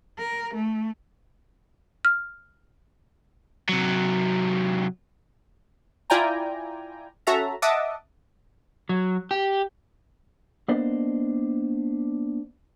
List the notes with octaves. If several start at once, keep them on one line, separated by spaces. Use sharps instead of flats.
A#4
A3
F6
C3 F#3
E4 F4 D5 G5 G#5 A#5
C#4 F#4 A4 E5 A#5
D#5 E5 F#5 A5 D6 D#6
F#3
G4
A#3 B3 D4 C5 D5 D#5